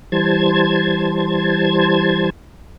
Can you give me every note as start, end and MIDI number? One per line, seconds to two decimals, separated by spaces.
0.12 2.30 52
0.12 2.30 55
0.12 2.30 72
0.12 2.30 81
0.12 2.30 92